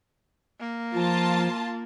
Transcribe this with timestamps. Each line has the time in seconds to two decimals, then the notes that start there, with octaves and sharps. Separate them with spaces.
0.60 A#3
0.94 F3 F4 A5